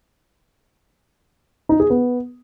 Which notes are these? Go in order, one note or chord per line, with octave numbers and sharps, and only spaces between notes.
D#4
G#4
B3